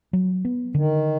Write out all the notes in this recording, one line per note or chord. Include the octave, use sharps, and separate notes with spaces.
F#3
B3
D3 D#3